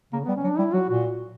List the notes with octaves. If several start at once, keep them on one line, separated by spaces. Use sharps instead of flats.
C#3 A#3
G3 B3
C#4
F#3
D4
G3 E4
F#3 F#4
A#2 F#4